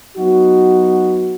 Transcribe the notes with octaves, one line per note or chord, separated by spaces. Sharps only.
F#3 B3 D#4 F#4